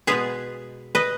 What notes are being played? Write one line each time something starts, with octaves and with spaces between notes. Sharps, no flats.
B2 G#3 B3 G#4 B4
B4 D#5